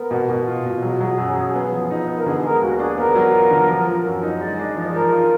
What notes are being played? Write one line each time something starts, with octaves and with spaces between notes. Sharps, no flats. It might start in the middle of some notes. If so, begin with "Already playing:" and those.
Already playing: B3 A#4
B2
B2
F4
B2
F#3 G#4
F#3
F#2
F#2
B3
F3
D#4
B3
A#4
D3 G#4
G#3 A#4
D#2 F#4
D4 G#4
B3 A#4
F#3
F4
D3
F3
F3
F#2
D#4 D#5
G#3 D5
D4 D#5
F3 D5
G#4
F3 A#4
F4